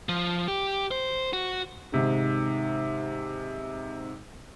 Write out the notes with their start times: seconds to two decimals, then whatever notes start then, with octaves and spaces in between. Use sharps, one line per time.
0.09 F3
0.48 G4
0.91 C5
1.33 F#4
1.92 G#2 C3 D#3